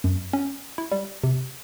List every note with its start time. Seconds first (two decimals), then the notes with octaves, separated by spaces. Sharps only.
0.04 F#2
0.33 C#4
0.78 E4
0.92 G3
1.24 C3